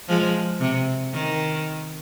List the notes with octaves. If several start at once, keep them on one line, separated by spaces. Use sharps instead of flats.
F3 G#3
C3
D#3